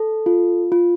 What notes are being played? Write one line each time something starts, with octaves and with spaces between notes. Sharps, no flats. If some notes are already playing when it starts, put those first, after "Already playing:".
Already playing: A4
F4
F4